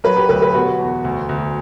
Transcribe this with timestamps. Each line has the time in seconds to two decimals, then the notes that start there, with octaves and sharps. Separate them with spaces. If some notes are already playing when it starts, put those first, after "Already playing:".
0.04 F#3 B4
0.16 G4
0.29 D2 B4
0.42 B4
0.54 B2 F#4
0.79 E2
1.05 D2
1.29 D2